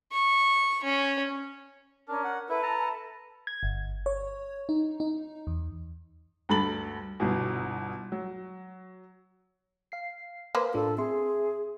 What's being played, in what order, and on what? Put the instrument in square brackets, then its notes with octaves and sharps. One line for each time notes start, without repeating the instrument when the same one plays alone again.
[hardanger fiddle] C#6
C#4
[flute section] C#4 A#4 F6 [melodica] D4
[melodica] F#5
[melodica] E4 [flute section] A4 B4
[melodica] A5 A#5
[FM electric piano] G#6
G1
C#5
D#4
D#4
E2
[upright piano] D2 G2 A4 B5 A6 F#7
G1 C2 B2
F#3
[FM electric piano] F5 C7
[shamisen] A#3 B4 C5
[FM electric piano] A2 D4 F4 [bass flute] A4
[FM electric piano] C4 E5 C6 [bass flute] G#4